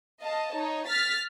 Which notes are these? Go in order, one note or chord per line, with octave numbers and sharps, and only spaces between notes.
D#5 F5 A5
D#4 C#5
F6 A6 B6